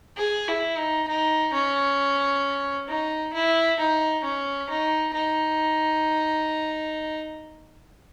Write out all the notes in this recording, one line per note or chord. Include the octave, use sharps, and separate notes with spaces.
G#4
E4
D#4
D#4
C#4
D#4
E4
D#4
C#4
D#4
D#4